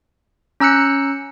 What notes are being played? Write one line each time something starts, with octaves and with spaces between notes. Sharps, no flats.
C#4 A#5 E6 F#6 C#7